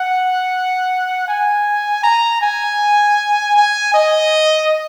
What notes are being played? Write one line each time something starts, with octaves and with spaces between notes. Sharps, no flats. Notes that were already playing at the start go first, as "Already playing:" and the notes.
Already playing: F#5
G#5
A#5
G#5
G#5
D#5